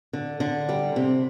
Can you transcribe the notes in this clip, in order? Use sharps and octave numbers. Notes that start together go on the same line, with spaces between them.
D3
D3
G3
C3